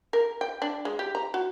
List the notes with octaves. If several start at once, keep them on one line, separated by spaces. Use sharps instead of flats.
A#4
G5
D4
G#3
G4
A#5
F#4